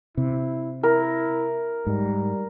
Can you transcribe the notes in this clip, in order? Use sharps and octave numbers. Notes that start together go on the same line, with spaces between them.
C3 E4
E4 A#4
G#2 G3